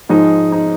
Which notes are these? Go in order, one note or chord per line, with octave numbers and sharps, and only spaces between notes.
G#2 F3 G#3 D#4
D#4